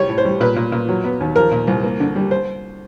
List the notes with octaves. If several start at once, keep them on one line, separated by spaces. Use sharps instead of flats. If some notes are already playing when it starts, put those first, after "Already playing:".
Already playing: C2 G3 C#5
A2
C5
G3
A#2 B4
A#2
A#2
F#3
B3
D#2
F3 A#4
A#2
C2
A#3
D3
G3
C5